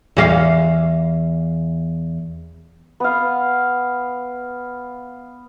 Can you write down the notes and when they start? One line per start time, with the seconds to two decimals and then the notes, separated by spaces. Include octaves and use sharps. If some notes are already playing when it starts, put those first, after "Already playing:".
0.17 E2 F#4 F5
3.00 B3 F5